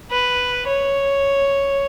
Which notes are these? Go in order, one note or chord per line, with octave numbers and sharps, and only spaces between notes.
B4
C#5